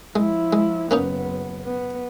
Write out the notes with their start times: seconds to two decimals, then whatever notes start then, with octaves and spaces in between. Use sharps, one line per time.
0.16 F3 G#3 E4
0.53 G#3
0.91 F#1 A#3 B3 C#4 D#4
1.64 B3